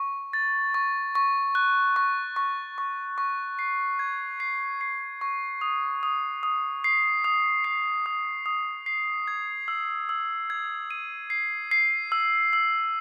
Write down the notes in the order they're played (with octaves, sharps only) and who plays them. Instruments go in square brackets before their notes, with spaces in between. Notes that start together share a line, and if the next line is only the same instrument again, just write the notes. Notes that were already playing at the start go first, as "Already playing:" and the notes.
Already playing: [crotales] C#6
A6
C#6
C#6
F#6
C#6
C#6
C#6
C#6
C7
G#6
C7
C7
C#6
D#6
D#6
D#6
C7
D#6
C7
D#6
D#6
C7
G#6
E6
E6
G#6
D#7
C7
C7
E6
E6